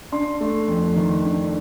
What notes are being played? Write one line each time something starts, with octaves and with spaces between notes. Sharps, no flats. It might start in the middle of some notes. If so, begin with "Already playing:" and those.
D4 C6
A3
F2
D#3
D4